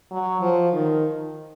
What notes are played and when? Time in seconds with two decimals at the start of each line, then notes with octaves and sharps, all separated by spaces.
0.12 F#3
0.41 F3
0.73 D#3